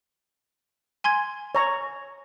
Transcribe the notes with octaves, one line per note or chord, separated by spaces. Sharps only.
G#5 C6 G#6
C#5 A#5